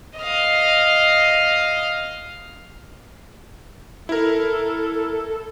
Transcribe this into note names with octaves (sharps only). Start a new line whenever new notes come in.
D#5 F5
E4 A4 A#4